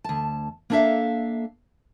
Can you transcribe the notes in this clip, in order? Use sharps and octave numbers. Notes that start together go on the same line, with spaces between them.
D2 A5
A#3 B3 D4 A4 E5 F5